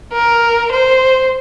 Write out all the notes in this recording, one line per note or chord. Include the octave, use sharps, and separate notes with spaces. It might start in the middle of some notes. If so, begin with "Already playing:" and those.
A#4
C5